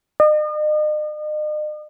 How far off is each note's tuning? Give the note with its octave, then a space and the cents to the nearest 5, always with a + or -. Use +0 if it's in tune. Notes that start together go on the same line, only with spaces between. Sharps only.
D#5 -45